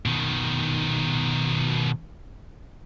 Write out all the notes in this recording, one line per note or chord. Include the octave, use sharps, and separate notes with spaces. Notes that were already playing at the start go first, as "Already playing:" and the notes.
B2 D#3